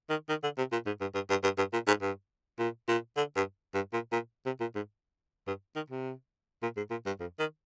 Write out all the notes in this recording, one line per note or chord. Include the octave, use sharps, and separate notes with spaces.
D#3
D#3
D3
C3
A#2
G#2
G2
G2
G2
G2
G2
A#2
G#2
G2
A#2
A#2
D3
G2
G2
A#2
A#2
C3
A#2
G#2
G2
D#3
C3
A#2
G#2
A#2
G2
F2
D#3